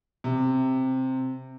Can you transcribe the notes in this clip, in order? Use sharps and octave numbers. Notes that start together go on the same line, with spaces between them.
C3